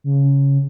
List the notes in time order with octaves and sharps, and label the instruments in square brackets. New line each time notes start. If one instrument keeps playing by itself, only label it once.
[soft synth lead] C#3